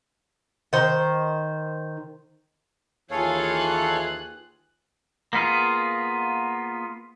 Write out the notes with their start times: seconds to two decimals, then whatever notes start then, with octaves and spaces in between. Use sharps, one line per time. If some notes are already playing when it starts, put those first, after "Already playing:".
0.73 D#3 C5
3.11 D#2 E3 F4 G#4 A4 C#5 F5 F#6
5.33 A#3 B3 F4 G#4